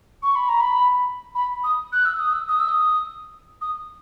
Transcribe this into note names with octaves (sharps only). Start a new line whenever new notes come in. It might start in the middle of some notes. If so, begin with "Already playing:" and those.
C#6
B5
A#5
B5
B5
D#6
F#6
E6
D#6
E6
D#6
E6
D#6
D#6